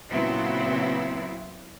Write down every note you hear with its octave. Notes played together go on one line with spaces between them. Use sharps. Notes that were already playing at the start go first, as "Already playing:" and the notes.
A#2 C#3 F#3 B3 C4 E4